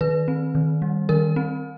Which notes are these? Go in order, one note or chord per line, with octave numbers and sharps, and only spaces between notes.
D#3 B4
C4
D#3
G3
D#3 A#4
C4